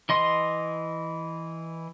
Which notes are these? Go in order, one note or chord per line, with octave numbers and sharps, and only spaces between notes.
E3 D#5 C6